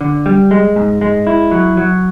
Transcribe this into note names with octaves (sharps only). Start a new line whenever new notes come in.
D3
G3
G#3
G#2
G#3
E4
F#3
F#3